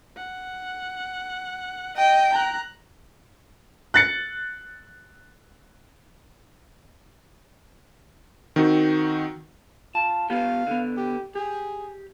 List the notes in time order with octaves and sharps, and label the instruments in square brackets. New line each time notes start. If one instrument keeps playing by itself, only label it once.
[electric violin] F#5
[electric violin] D#5 [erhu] G5
[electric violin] A#5 F#6
[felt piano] F#6 A6 C#7
[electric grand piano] D#3 C4 D#4 F#4
[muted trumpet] F4 [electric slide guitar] A5
[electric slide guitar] B3 F4 G4 [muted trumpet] F5
[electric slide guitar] D3 B3
[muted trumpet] G4
[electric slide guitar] G4 [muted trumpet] G#4